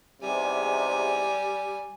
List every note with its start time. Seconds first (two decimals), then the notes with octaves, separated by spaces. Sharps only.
0.23 E2 G#2 C3 G3 G#5